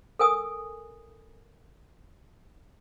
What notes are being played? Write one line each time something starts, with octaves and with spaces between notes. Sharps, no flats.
A4 A#4 G#5 D#6